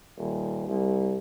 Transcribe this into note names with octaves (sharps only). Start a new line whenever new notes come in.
D#1
C2